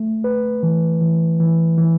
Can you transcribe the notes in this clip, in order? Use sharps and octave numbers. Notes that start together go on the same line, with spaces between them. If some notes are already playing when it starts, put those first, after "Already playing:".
Already playing: A3
B4
E3
E3
E3
E3